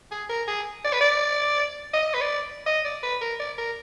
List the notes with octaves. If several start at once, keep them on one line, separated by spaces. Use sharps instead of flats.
G#4
A#4
G#4
D5
B4
D5
D#5
B4
D5
D#5
D5
B4
A#4
D5
A#4